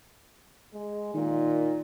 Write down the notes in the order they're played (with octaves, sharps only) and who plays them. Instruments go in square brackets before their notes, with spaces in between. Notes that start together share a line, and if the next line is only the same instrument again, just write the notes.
[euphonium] G#3
[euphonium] A#2 [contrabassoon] D#3